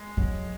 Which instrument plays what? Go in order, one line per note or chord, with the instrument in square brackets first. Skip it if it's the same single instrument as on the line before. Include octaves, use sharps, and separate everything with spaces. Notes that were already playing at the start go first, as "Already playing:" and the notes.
Already playing: [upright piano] G#3
[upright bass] F#3